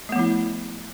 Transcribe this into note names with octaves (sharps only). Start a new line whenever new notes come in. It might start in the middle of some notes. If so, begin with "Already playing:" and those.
F3 A3 B3 E4